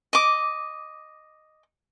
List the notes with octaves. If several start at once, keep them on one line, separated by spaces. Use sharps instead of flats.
D#5 D6